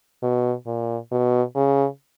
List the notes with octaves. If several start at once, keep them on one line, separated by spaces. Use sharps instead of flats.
B2
A#2
B2
C#3